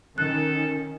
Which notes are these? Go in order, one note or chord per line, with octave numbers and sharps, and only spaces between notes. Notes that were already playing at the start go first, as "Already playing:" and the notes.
D#3 C#4 A4 F#6